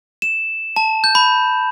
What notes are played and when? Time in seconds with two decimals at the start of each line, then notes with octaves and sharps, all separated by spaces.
0.22 E7
0.76 A5
1.04 G6
1.15 B5